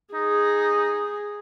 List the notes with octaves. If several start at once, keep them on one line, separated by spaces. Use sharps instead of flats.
D#4 G#4